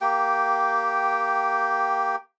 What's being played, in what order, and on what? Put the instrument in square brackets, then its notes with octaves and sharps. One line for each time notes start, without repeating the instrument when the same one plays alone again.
[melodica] A#3 G4 G5